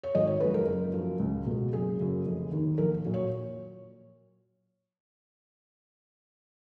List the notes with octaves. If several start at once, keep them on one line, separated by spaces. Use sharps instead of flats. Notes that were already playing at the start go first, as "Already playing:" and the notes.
C#5
G#1 D#5
C#5
F#2 F3 G#3 B4
A#4
F#1
F#2 F3
C#2
B2 G#3
F#1 G#4
F#2 C#3
F1
D#2 D#3
A#1 A#4
A#2 F#3
C#5